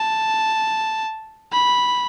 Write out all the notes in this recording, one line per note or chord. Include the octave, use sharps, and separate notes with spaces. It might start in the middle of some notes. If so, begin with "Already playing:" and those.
Already playing: A5
B5